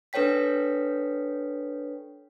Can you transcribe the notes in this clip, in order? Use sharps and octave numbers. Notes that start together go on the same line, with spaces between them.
D4 A4 B4 C#5 G5 B6